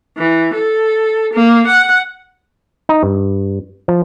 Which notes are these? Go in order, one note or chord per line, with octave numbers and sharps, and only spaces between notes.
E3
A4
A#3
F#5
D#4
G2
F3